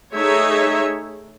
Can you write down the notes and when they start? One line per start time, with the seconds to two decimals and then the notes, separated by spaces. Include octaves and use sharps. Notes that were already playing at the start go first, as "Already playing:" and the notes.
0.14 A3 D#4 G#4 C#5 E5